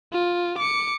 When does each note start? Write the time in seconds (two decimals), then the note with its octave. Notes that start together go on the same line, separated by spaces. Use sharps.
0.13 F4
0.58 D6 C#7